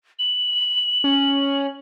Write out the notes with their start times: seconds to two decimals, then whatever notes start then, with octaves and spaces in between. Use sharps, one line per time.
0.19 F#7
1.04 C#4